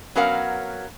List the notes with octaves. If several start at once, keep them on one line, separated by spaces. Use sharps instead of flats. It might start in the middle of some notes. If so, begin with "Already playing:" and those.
F#3 B3 C#4 A#4 F5 F#5